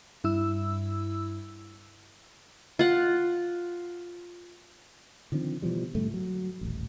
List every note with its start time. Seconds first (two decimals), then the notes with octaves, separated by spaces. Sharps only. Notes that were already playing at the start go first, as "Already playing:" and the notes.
0.24 G2 E4 E6
2.79 F4 F#5
5.32 D3 D#3 F3 C4
5.62 B2 E3 F3 G3
5.95 G#2 D3 G3 A3
6.14 F#3
6.61 D#1 A1